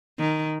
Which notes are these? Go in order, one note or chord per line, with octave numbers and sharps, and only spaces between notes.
D#3